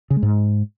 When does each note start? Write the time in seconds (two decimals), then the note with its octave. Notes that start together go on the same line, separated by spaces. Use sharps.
0.10 C#3
0.17 G#3
0.23 G#2